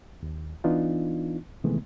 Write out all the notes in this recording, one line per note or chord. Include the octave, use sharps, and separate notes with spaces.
D#2
E3 B3 D4 D#4 F4
C3 D#3 E3 G#3 A3 B3